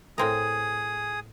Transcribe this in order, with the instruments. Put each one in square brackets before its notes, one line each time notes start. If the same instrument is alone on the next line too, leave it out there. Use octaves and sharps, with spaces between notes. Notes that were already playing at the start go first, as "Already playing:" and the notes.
[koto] A2 C4 A#4 [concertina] G#4 D#6